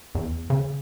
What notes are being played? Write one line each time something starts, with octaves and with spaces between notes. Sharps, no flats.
E2
C#3